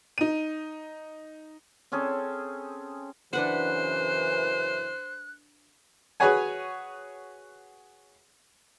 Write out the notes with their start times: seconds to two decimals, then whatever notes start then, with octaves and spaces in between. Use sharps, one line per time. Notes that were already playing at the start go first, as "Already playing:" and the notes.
0.18 D#4 D#7
1.92 C4 C#4 G#4 A4
3.33 F#2 C#3 E3 D4 B4 C5 F#5 F#6
6.20 F#4 G#4 B4 C#5 F#5 G#5